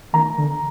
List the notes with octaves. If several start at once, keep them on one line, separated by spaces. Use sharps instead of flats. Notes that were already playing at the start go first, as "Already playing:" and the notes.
D#3 A#5
D3